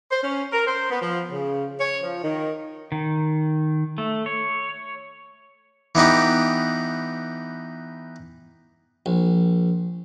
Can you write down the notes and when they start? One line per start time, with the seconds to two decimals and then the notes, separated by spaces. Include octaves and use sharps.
0.11 C5
0.23 C#4
0.53 A#4
0.67 C5
0.90 B3
1.02 F3
1.32 C#3
1.80 C#5
2.03 F3
2.24 D#3
2.92 D#3
3.98 A3
4.26 C#5
5.95 E3 B3 D#4 G4
9.06 A#1